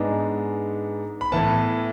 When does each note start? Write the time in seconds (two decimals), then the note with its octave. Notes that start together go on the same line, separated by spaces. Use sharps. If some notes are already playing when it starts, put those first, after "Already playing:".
Already playing: G#2 G#3 B3 D4
1.21 B5
1.32 A2 E3 B3 A5